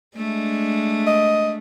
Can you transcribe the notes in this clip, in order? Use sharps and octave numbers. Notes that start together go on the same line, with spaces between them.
G#3 A3 D4
D#5